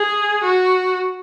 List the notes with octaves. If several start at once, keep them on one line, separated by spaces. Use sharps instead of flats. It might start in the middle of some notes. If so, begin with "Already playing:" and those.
Already playing: G#4
F#4